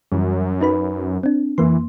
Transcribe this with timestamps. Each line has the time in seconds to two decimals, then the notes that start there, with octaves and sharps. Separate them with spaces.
0.12 F#2 E3 G3
0.61 D#4 B4 B5
1.23 C4 D4
1.58 F2 E3 A#3 C6